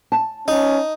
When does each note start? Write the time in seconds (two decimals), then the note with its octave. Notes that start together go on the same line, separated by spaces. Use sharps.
0.12 A5
0.48 C#4 D#4